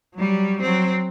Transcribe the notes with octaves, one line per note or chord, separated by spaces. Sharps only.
F#3 G3
F#3 C4